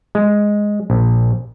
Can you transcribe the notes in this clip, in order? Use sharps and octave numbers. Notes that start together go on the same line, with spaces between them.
G#3
A#1